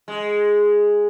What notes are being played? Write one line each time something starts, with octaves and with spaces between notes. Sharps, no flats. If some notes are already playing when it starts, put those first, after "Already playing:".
G#3